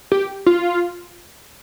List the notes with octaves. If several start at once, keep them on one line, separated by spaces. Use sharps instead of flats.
G4
F4